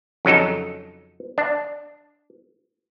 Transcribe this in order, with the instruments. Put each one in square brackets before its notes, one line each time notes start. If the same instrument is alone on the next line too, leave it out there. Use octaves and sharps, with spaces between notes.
[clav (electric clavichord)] F2 C#3 F#3 D#4 A4
D4